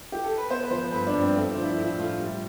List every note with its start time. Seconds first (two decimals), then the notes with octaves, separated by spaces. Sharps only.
0.12 G4
0.24 A4
0.38 B4
0.50 B3 C5
0.64 B4
0.71 F3 C5
0.92 G2 B4
1.07 D4
1.14 G2
1.21 C4
1.35 A3 C4
1.49 D4
1.56 F3
1.63 E4
1.77 A2 E4
1.98 A2 F4
2.20 G3